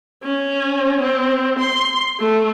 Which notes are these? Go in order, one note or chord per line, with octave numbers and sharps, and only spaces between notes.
C#4
C4
C6
A3